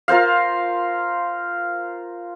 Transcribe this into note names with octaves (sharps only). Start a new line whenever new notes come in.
F4 A#4 C5 F5